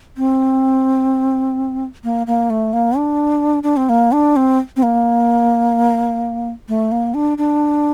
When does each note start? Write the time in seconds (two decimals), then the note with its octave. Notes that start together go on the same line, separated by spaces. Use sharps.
0.17 C4
2.04 A#3
2.27 A#3
2.50 A3
2.73 A#3
2.97 D4
3.63 D4
3.77 C4
3.89 A#3
4.12 D4
4.36 C4
4.76 C4
4.83 A#3
6.69 A3
6.92 A#3
7.14 D4
7.38 D4